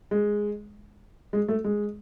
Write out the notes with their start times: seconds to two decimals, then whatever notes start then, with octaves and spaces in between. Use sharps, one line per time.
0.11 G#3
1.33 G#3
1.48 A3
1.64 G#3